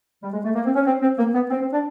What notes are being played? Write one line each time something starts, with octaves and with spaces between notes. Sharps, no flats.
G3
G#3
A3
A#3
C4
C#4
C4
C4
A#3
B3
C4
C4
D4